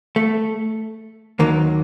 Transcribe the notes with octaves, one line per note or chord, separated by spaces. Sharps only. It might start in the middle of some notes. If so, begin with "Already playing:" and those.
A3
D#2 D#3 F#3 A#3